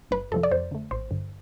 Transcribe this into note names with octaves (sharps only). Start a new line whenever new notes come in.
G1 B4
F2 C3 F3 A4
D5
F2 C5
D3 A3
A1 C5
G2 D3